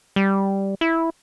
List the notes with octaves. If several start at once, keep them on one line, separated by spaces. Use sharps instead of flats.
G3
E4